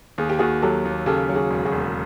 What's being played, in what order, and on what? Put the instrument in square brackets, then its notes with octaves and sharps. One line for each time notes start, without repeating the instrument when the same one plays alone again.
[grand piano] D#2 [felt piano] G#4
[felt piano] G4
[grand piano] D#2 [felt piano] F#4 G#4
[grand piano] F#3 [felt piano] G4 A4
[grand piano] D#2
[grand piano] C#3 [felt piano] G4 A4
[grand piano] F#3
[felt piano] F#4 G#4
[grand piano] E1
[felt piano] F#4 G#4
[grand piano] E1